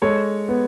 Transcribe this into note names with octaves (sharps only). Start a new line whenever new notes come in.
G#3 A4 C#5
B3